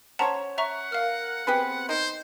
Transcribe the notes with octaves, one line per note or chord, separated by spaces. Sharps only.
C#4 C5 C#5 F#5 A5 A#5
E5 F#5 A#5 C#6
A#4 F5 F6
B3 C4 G4 G#4 B4
D#4 A#4 C5